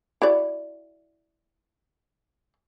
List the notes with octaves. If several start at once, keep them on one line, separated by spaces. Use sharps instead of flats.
E4 F#4 D5